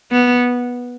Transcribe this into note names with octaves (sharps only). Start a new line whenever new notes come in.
B3